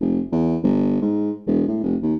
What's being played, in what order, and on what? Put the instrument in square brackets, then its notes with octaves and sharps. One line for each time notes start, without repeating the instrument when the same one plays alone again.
[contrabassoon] F1
E2
G1
G#2
E1
A2
F1
D#2